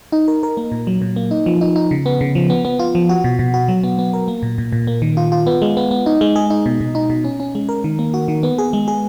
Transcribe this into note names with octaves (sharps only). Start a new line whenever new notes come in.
D#4
A#4
A#4
A#3
A#2
F#3
A#2
A#3
D#4
F3
D#4
D#4
C#3
B3
C#3
F3
B3
B3
F4
F3
F#4
B2
B2
F#4
F#3
B3
B3
A#4
A#3
A#2
A#2
A#2
A#3
D#3
F4
F4
B3
G#3
B3
B3
D#4
G#3
G#4
D#4
B2
B2
D#4
B2
C#4
C#4
G#3
A#4
D#3
A#3
F#4
D#3
B3
G#4
G#3
G#4